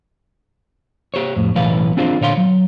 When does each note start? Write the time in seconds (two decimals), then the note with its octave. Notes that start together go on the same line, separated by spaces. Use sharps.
1.14 G4 C5 C#5
1.36 F2 A2
1.55 B1 A2 E3 B4 C#5 F5
1.97 C4 D4 F4 G#4 C5
2.21 A#2 D3 C#5 F5 C6
2.37 F#3